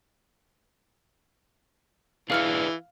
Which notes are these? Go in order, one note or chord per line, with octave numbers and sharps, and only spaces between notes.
E3 D4 G#4 B4 F5 F6 C#7